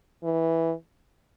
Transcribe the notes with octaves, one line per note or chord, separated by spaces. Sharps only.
E3